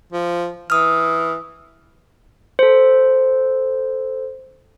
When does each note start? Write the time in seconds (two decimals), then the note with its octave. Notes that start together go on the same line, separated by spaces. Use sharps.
0.12 F3
0.70 E3 D#6 F6
2.59 A4 C5